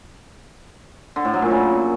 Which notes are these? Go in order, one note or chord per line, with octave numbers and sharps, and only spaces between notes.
D3
A2
F#3
A#2
C#3